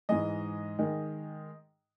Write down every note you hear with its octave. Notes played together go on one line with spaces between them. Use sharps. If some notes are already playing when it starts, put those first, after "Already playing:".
G#2 E3 G#3 D#5
D#3 G#3